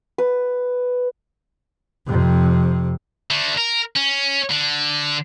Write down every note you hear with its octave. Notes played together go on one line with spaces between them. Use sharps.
B4
F2 C3
D3 A3
A#4
C#4
D3